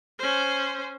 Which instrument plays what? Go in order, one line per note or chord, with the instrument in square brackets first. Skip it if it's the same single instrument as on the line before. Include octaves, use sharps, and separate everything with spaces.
[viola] C#4 C5